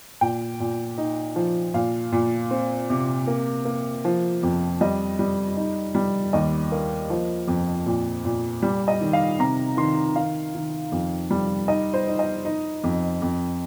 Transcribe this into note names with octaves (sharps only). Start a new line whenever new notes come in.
A#2 G5
A#2
D#4
F3
A#2 F5
A#2
C4
C3
A#3
A#3
F3
F2
G3 D#5
G3
D#4
G3
D#2 D#5
A#3
F3
F2
A#2
A#2
G3
D#5
D#3
F5
C3 A#5
D#3 C6
D#3 F5
D#3
F2
G3
D#4 D#5
C5
D#4
D#5
D#4
F2
F2